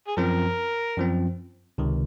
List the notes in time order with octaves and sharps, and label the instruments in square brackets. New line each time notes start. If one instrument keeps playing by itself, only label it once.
[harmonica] G#4
[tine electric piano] F#2 F3 C4 [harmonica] A#4
[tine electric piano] F#2 F3 C4
C#2 C3 D#3